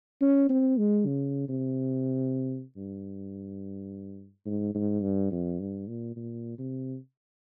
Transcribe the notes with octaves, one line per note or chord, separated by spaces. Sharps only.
C#4
C4
G#3
C#3
C3
G2
G#2
G#2
G2
F2
G2
A#2
A#2
C3